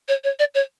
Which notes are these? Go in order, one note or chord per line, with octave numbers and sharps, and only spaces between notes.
C#5
C#5
D5
C#5